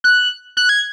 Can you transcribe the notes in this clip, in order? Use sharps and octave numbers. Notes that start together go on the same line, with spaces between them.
F#6
F#6
G#6